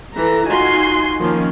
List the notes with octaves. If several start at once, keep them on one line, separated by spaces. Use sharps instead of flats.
E3 A4 A#5
D#4 F4 F#4 G#5 C6
D#3 F3 A#3 C#4